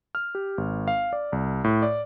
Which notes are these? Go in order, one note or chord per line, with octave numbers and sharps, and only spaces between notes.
F6
G4
G#1
F5
D5
C2
A2
D5